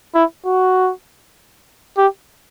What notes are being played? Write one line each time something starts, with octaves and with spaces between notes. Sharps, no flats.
E4
F#4
G4